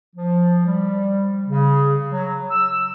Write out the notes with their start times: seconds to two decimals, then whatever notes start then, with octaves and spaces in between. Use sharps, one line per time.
0.16 F3
0.66 G3
1.47 C#3
2.09 F#3
2.51 E6